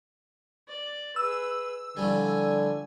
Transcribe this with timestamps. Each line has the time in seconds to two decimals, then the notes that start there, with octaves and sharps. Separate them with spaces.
0.68 D5
1.16 G#4 B4 E6
1.97 A2 D3 F3 G3 G#5